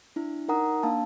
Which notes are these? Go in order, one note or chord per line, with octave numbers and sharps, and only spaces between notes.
D4 E4
D#4 A#4 F#5 A#5 D#6
A#3 D4 F5 A5